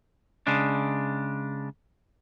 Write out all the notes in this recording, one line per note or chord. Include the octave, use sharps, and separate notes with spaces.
C#3 G#3 D4